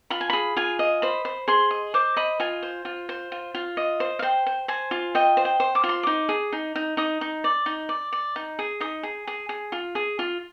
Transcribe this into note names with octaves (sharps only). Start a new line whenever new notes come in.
F4 B5
G#5
G#4 B5
F4 G#5
D#5
C5 B5
C5
G#4 C6
D#5
C5 D6
D#5 B5
F4 G#5
C5
F4
C5
F4
F4
D#5
C5
F5
C5 G5
C5
C5 G#5
F4
D#5 G5
C5
G5
C5
D6
F4
C6
D#4 D6
G#4
D#4
D#4
D#4 D#6
D#4
D5
D#4
D5
D5
D#4
G#4
D#4 D#6
G#4
G#4
G#4
F4
G#4
F4